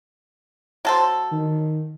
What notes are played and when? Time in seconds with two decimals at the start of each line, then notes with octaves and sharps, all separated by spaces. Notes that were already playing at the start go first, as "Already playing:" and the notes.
0.85 F#3 A4 C5
1.32 D#3